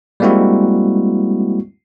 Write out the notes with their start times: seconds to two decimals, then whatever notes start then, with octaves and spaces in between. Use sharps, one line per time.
0.20 G3 G#3 A#3 C4 E4 F#4